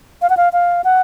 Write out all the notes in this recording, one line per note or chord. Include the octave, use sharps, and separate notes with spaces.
F5
F#5
F5
F5
F#5